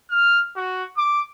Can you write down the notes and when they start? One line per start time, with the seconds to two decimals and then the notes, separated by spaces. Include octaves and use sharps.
0.10 F6
0.56 F#4
0.97 D6